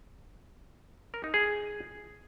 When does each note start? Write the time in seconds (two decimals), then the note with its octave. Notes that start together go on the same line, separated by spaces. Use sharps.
1.14 A#4
1.24 D#4
1.34 G#4